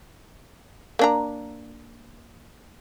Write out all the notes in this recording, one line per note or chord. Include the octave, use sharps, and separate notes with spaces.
A#3 D4 A#5